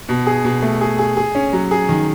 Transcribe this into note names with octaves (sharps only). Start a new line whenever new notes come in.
B2
G#4
B2
A3
G#4
G#4
G#4
C#4
F#3
G#4
D#3